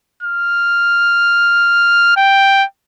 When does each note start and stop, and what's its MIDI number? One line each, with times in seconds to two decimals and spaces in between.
0.23 2.14 89
2.17 2.64 79